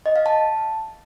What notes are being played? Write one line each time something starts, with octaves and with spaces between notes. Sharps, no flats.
D#5
F5
A5